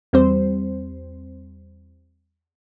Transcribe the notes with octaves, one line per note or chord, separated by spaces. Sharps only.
E2 G3 C4 C5